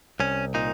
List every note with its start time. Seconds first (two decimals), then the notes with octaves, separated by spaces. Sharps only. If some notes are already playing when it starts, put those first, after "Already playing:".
0.20 C2 C#4
0.54 A#2 D#4